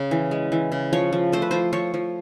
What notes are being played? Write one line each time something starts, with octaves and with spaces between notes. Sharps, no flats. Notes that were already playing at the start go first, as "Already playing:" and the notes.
Already playing: C#3
E3
G#3
E3
C#3
F3 C#5
F3
A3 C5
B4
F3 C5
F3 C#5
F3